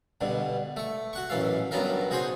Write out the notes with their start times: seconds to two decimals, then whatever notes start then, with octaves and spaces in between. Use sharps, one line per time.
0.21 G2 B2 D3
0.77 A3 C#6
1.13 F#4 F#5 C#6
1.30 A1 F#2 E3 A4 F5
1.71 G2 F#3 B3 A4 A#4 F5
2.11 D#4 F#4 G#4 C5 C#5